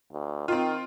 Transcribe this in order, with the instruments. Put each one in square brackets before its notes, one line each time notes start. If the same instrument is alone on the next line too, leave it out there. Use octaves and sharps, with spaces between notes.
[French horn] D2
[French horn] D#3 [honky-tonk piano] C4 F4